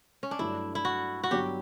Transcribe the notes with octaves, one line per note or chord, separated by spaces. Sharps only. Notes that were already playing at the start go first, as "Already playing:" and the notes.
C#4
D4
G2 F#3 A3 E4
E4
F#4
F#4
G2 F#3 B3 G4